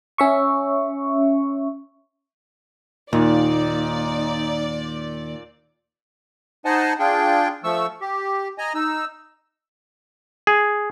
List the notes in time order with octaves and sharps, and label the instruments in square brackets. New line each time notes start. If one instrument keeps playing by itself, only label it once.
[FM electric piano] C#4 E5 C#6
[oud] D#2 [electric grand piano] A#2 [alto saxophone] D#4 [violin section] D5
[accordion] D#4 C5 D#5 F#5 G#5 A5
D4 F4 G#4 G5
F3 A3 C#6 E6
G4
D#5 G#5 A#5
D#4 E6
[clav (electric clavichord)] G#4